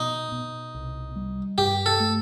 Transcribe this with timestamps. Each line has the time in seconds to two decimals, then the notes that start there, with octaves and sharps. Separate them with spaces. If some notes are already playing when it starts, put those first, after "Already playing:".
Already playing: B2 D#4
0.32 B2
0.74 C2
1.16 G3
1.58 G2 G4
1.86 A4
2.00 A3